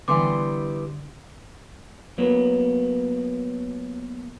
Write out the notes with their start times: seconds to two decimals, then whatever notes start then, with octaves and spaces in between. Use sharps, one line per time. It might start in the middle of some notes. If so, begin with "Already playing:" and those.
0.08 D3 E3 G3 B3 C6 D6
2.18 F#3 A#3 B3